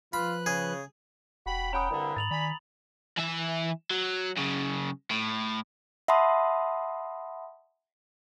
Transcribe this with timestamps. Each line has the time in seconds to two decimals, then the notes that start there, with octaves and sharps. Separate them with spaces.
0.13 F3 F4 B4 B5 F#6
0.46 C#3 G#4
1.46 E1 F#4 G5 B5
1.73 C#4 F#5 G5 A#5 B5 D#6
1.91 C2 G2 D3
2.17 G#2 A6 F7 F#7
2.31 D#3 D5 G#5 B5
3.18 E3 E5
3.91 F#3
4.37 F#2 C#3
5.11 A2
6.08 E5 F#5 A5 B5 C6 D#6